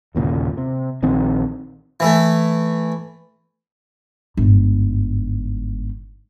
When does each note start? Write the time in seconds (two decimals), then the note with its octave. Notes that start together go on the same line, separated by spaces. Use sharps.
0.15 G1 D#2 A#2 C#3
0.57 C3
1.03 A#1 D#3 C4
2.00 E3 A3
4.37 G1 G#2